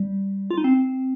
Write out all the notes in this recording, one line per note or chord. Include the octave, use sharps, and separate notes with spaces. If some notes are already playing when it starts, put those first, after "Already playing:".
Already playing: G3
F4
D#4
C4